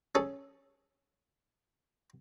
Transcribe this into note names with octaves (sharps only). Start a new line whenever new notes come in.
C#4 G#4 A4